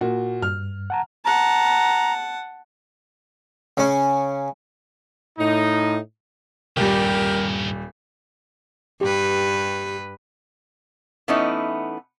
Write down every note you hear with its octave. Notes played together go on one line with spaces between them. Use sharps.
A#2 F#4
G2 F6
F#5 A5 A#5
F#5 A5 A#5
C#3 C#4
A2 D#4
D#1 G2 A#2 G3 G4 A#4
G2 G4 B4
E3 A3 B3 C#4 D#4 E4